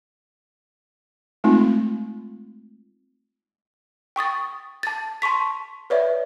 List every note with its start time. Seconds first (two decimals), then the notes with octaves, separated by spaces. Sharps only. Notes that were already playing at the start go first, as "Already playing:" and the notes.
1.44 G#3 A3 C4 D#4 F4
4.16 G5 C#6 D#6 A6
4.83 A5 A6
5.22 A5 C6 C#6 B6
5.90 B4 C#5 D5 E5